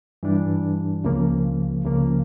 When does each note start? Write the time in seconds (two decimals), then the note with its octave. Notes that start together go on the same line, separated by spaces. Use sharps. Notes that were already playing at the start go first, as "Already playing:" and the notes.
0.23 G2 E3 G3 D4
1.04 C#2 C#3 F3 A#3
1.85 C#2 C#3 F3 A#3